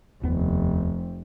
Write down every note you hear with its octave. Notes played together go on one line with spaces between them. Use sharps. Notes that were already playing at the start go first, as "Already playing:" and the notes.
F1 D#2 C3 B3